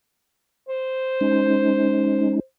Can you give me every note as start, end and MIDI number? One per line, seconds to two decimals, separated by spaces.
0.69 2.42 72
1.21 2.40 56
1.21 2.40 61
1.21 2.40 63